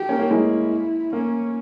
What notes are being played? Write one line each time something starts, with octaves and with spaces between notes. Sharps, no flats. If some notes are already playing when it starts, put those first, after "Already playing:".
Already playing: G4
A#3 C#4
A#3
G#3 E4
A#3 C#4